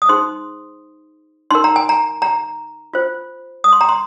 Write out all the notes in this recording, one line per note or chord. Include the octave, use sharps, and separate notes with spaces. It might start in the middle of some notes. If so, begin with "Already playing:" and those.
D#6
D#4 G#4 C5 C6
D#4 A#4 C6
A#5
G#5
A#5
A#5
F4 C5
D#6
C6
A#5
C6